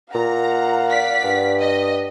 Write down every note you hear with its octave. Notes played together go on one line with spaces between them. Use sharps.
A#2 F5 F#5 A#5
D5 B6
G2
D#5